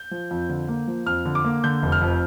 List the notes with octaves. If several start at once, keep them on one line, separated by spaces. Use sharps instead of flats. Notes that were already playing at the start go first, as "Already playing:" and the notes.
Already playing: G6
F3
F2
D3
A#3
F3
F2 F6
D3
D6
A#3
D3 G6
F1
F6
F2